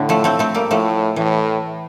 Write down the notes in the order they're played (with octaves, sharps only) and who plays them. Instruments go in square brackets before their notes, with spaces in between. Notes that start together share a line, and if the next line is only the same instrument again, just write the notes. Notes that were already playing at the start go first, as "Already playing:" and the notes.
Already playing: [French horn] A2 [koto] D3
[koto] F3 A3
A3 C4
A3 C4
G3 A#3
[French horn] A2 [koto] F3 A3
[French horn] A2 [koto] E3